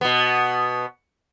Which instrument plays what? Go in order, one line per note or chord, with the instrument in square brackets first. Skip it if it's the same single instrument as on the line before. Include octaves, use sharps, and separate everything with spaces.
[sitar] B2 B3